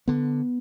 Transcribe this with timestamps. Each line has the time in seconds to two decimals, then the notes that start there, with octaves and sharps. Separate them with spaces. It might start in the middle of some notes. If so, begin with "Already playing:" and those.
0.08 D3 B3